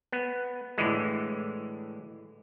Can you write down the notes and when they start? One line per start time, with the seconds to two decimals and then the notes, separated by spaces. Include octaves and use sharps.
0.12 B3
0.78 A2 D3 E3 G#3